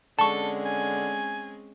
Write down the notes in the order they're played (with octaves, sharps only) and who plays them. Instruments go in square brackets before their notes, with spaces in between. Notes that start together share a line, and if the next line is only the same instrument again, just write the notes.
[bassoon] D3 [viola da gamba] G#3 C4 C#4 [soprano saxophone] A4 [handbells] A5 C#6
[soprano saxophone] G#5